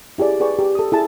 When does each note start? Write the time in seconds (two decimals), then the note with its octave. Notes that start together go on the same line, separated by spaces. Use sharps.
0.18 E4 G4 G#4 D5
0.40 G#4 B4 D5 G5 C#6
0.59 G4
0.75 A4 D#6
0.92 E4 G#4 A5